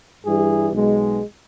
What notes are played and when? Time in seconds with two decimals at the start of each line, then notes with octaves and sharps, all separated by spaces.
0.24 G2 E3 G3 E4 G#4
0.72 B1 B2 G#3